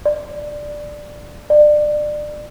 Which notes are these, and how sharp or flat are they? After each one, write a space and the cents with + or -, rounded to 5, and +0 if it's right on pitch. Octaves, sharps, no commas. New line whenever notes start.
D5 +5
D5 +25